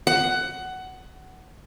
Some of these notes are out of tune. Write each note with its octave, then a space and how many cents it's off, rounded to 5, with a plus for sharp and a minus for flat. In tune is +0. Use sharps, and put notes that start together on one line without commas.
F#5 +15